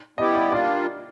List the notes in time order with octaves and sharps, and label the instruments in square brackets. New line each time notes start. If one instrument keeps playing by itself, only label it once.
[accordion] G3 B3 E4 G4 [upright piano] D#5
[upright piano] D5
[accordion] G3 A#3 D4 F4 [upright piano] D5